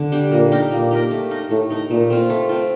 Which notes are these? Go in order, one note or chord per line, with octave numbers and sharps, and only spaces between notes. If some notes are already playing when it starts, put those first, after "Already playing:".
Already playing: D3
G3 D4 G4
A#2 A#3
D#4 G4 A#4
A#2 A#3
D#4 G4 A#4
A3
D#4 A#4
A2 A3
D#4 A#4
A#2 A3
C4 F4
A3
C4 F4